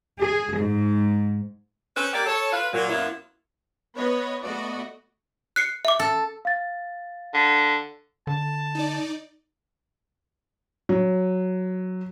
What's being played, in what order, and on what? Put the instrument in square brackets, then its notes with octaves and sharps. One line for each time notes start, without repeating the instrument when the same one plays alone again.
[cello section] G#4
G#2
[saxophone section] C#4 A4 B4 C5
A#3 G4 D5
A4 C#5
F4 B4 F5
A#2 F#3
F#2 F#3 A#3 B3 E4 F4
[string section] B3 B4 C#5 D#5
A3 B3 F#4 D5 D#5
[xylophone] F#6 C7 C#7
E5 D6
[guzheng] A4
[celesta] F5 A6
[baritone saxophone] D3
[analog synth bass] D3 [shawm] A5
[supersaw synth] D#4 D5
[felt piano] F#3